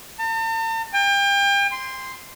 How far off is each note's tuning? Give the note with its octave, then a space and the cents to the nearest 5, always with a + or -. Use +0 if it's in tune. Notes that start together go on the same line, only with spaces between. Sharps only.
A5 +45
G5 +35
C6 -5